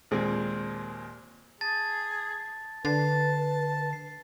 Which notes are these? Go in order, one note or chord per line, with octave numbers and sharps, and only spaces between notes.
D#2 A#2 G#3 C4
G#4 A5 A6
D3 B4 A5 A6 C7
C7